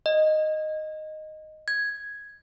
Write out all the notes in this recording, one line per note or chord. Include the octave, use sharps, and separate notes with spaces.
D#5
G#6